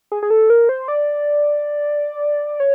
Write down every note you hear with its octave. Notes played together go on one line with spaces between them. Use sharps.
G#4
G#4
A4
A#4
C5
D5
C#5